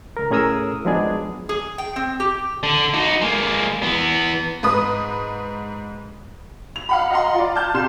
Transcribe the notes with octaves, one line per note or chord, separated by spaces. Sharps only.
C#2 A#4
A2 C#4 G#4 A#4 D#6 E6
F3 F#3 G#3 B3 D4 G#4
G#4
G5
C4
G4
D3
D#4 F#4
G#3 A#3
E3 B3
G#2 B4 D#6
F7
F5 F#5 B5
D#5 F5 F#5 A#5 C6
F4 D5
A5 F6 G6
C2 C3 C6 E7